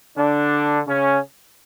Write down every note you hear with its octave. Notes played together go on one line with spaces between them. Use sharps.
D3 D4
C#3 C#4